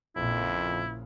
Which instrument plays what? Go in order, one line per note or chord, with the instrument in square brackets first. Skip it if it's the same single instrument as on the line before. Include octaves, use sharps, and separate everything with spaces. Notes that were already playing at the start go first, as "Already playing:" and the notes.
[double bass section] A#1 A#2 C#3 [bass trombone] F2 [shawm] E4